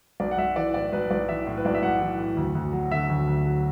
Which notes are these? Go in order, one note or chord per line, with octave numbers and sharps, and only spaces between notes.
B1 D5
F#5
B1 E5
E3 D5
A2 D5
B1 B4
B1 D5
E3 E5
A2
B4
B1 D5
E5
B1 F#5
E3
A2
D2
D2
F#3
D3 E5
D2
D2
F#3